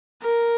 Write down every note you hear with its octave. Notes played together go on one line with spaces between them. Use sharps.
A#4